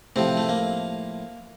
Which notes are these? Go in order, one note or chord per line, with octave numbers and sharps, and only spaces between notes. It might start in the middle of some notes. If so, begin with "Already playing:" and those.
A2 C3 F3 C4
A3
A#3